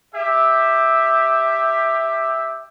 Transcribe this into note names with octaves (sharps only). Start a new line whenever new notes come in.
G4 E5